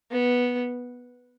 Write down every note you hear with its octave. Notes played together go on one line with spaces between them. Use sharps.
B3